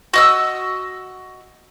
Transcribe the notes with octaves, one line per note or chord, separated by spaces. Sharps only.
F#4 D#5 E6